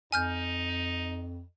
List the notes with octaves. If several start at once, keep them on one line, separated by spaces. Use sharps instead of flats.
F2 D#4 G#5 F6 G6